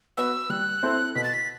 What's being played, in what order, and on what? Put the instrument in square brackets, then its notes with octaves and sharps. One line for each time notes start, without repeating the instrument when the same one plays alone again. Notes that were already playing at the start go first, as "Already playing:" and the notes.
[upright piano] B3 F#4 B4 [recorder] E6
[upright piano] G3 [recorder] F#6
[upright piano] C4 E4 A4 C5
[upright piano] B2 [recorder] B6
[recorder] A6
B6